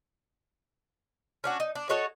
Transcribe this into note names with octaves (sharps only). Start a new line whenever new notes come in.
C#4 D4 F#4
D#4
D4
F#4 A4 C#5 D#5